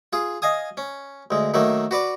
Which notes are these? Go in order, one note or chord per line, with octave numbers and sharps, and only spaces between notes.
F4 G#4
D#5 F5 G#5 D#6
C#4
D2 G#3
D#3 F#3 A3 A#3
F#4 B4 D5 D6